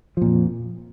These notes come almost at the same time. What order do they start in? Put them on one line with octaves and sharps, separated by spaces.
F3 A#2 F2